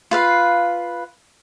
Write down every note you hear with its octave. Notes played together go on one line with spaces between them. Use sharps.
F4 B4 F5